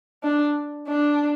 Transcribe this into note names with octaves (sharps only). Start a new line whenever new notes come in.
D4
D4